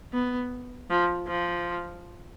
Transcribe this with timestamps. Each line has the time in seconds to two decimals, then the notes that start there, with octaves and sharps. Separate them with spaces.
0.13 B3
0.90 F3
1.27 F3